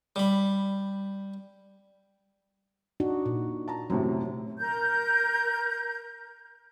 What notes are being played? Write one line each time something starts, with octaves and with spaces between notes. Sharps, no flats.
G3 B5
D4 D#4 F#4
A#2
A5 A#5
F#2 A2 C3 F#3
A#4 G6